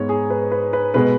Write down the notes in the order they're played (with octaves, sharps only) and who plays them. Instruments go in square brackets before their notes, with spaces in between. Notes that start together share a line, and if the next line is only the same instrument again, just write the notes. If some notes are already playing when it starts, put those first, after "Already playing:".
Already playing: [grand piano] G#2 G#3 B3 C#5
G#4
B4
B4
B4
B2 G#3 B3 B4